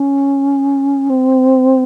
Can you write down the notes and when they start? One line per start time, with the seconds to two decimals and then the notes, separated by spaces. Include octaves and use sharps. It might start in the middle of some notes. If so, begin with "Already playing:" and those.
Already playing: C#4
1.10 C4